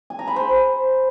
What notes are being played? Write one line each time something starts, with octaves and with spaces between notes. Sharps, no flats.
G#5
A#5
B5
C5